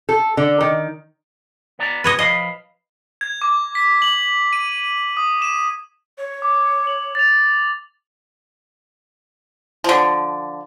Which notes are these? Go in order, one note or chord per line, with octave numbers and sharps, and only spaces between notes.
A4
D3
D#3
B3 D5 A#5
D2 G#2 C3 B4 C#5 D#5
F3 D#5 F5 B5
G#6
D6
B6
F#7
D#7
D#6
E7
C#5
D6
F#7
A6 F7
D3 F3